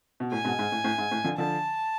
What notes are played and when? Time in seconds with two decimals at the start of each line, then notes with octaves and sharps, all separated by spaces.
0.20 B2
0.32 A2 G#5
0.44 G#2 B2
0.59 G#2
0.72 A2
0.84 A2
0.98 G#2
1.11 A2
1.24 D3 F3
1.38 D3 F3 A5